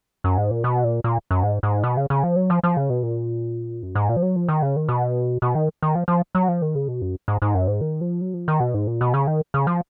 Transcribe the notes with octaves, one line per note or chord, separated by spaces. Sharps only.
F#2
G#2
A#2
B2
A#2
A#2
F#2
G#2
G#2
B2
C#3
C#3
F3
F#3
F3
F3
C#3
B2
A#2
F#2
G#2
A#2
F3
F#3
F3
D#3
C#3
D#3
B2
B2
D#3
D#3
F3
F3
F#3
F3
D#3
C#3
B2
F#2
G#2
G#2
F#2
G#2
D#3
F3
F#3
F3
D#3
B2
G#2
A#2
B2
C#3
D#3
C#3
F3